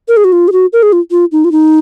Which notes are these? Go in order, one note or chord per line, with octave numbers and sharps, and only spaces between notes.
A#4
G#4
F#4
F4
G#4
F#4
A#4
G#4
F4
F4
D#4
F4
D#4